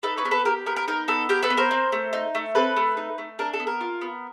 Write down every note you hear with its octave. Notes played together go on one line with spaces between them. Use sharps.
D#4 A4 B4
B4 C#5
B3 A#4
A4 B4
G4 A#4
B3 A#4
A#4
D#4 A#4
B3 A4
G4 A#4
A4 B4
B3
A#4 C5
C4
A3
D#4
A3
C4 A4 B4
A3
D#4
A3
D4 A#4
A4
B3
A#4
F4
B3